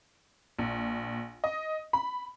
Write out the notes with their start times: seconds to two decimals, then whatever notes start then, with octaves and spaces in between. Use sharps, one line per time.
0.59 A#1
1.44 D#5
1.93 B5